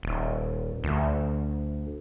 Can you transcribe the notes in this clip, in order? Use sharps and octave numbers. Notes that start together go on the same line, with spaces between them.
D#1
D2